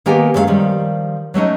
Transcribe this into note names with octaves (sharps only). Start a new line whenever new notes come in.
D#3 A#3 B3 G4 F#5 G#5
F#2 G#3 A3 F#4 F5
D#3 F3 G3
F#3 A3 C#4 D#4